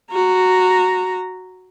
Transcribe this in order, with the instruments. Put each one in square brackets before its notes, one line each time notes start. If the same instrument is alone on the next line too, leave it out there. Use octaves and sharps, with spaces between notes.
[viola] F#4 A#5